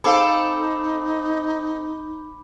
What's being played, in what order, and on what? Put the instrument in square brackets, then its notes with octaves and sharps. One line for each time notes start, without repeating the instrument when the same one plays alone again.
[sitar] C4 A4 [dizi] D#4 [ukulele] G#4 F5 G5 [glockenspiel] B5 D6